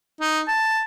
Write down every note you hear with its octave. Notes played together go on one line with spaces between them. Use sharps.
D#4
A5